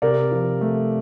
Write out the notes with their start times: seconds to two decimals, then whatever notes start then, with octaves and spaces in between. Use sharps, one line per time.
0.02 C3 A#4 D5
0.31 F3
0.61 A3